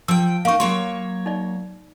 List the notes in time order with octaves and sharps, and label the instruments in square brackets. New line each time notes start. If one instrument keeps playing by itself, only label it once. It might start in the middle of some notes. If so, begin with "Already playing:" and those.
[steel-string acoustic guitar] F3 G5 [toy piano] E6
[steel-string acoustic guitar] A#3 D#4 [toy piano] F5 C#6
[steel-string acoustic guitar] F#3 A#3 C#5 [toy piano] C6
[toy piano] D#4 D5